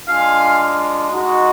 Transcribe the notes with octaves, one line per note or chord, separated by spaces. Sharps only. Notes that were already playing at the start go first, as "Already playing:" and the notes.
G#3 D4 F4 F5 G#5
G#3 D#4 F#4